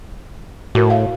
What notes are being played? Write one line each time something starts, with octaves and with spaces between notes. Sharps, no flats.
A2 F#4 A#4
F5